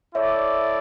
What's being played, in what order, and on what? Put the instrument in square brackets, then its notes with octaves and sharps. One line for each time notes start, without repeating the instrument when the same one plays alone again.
[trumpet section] E4 A4 D5 [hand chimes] C#5 E5